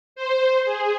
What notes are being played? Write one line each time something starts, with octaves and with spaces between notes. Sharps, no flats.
C5
G#4